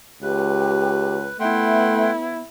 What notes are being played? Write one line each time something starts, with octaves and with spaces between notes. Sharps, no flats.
C#2 G4 B4
A3 B3 E4 F#5 G5 C6